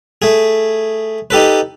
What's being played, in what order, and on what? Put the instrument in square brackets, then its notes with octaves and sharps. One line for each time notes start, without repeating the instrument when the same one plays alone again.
[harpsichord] A3 G#4
D#4 G4 A4 B4